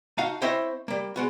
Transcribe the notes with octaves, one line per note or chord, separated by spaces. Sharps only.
D#4 F#4 F5 F#5 A5
C4 E4 C5 C#5 D#5 E5
G3 A#3
G#3 B3 F#4